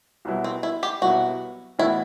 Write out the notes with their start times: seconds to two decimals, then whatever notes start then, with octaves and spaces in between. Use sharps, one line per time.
0.25 C2 B2 F#3 B3 E4
0.44 C4
0.63 E4
0.83 G4
1.02 C2 B2 F#3 B3 E4 F#4
1.79 A2 E3 B3 E4 F#4